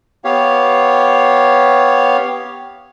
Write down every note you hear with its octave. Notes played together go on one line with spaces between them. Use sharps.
B3 G4 C#5 F5